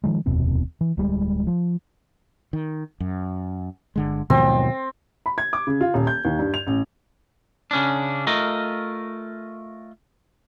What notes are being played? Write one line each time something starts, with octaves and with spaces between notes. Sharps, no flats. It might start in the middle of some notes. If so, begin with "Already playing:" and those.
D#3 F3 G#3
F1 D#2 B2 C4
E3
D1 G3 G#3
F3
D#3
F#2
G1 D3 G#3
D#2 G#2 B2 D#3 F3 F#3 C4
B5
G#6
D6
C#3
F4
D#1
G6
D#2
G2
F7
A1
C#3 C#4 D4
A3 F4 A#4 D#5